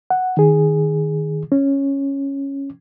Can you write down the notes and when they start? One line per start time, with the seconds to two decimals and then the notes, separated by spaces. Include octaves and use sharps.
0.10 F#5
0.37 D#3 G#4
1.52 C#4